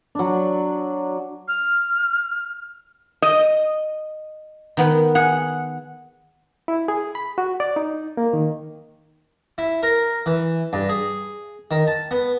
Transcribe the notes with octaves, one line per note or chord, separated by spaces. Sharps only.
F#3 D4
F6
D#5
D#3 B3 B4
G#4 F#5
E4
G#4
B5
F#4
D5
D#4
A#3
D#3
E4
A#4
E3
G2
G#4
D#3
A5
B3